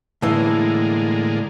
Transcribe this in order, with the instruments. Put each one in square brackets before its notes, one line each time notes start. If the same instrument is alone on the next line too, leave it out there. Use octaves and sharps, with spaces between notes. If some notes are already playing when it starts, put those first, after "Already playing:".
[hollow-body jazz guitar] A2 E3 [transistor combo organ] D3 G#3 A#3